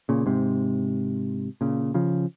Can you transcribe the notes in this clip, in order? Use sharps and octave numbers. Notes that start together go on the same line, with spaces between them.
A#2 C#3
G#2 C3
A#2 C#3
C#3 F3